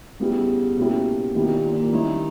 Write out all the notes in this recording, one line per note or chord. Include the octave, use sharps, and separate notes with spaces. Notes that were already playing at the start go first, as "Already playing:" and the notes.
C#3 G3 B3 E4 G4
B2 A#3 C#4 E4 G4
B2 D#3 A#3 E4 G4
A#2
A#2
D#3 G3 C#4 E4